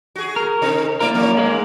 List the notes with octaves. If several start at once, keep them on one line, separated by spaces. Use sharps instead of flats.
F#4 G#4
A#4
C3 C4 D#4
A#3 E4 A#4 D5
F2 F#3 C#4
G#2 G#3 A#3